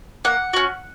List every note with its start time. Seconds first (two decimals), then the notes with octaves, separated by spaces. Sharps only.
0.25 A#3 F#5
0.53 C#4 F#4